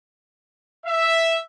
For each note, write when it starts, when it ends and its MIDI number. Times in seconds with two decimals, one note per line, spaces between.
0.86 1.38 76